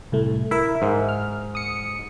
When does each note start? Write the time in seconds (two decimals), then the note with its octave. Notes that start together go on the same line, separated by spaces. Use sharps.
0.12 C2 A2 A3
0.51 E4 A#4 E5
0.82 G#2
1.09 F6
1.55 D#6 C#7